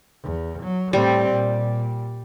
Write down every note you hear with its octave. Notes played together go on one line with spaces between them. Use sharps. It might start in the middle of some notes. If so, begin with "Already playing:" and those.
E2
F#3
A2 G3 C4
A#2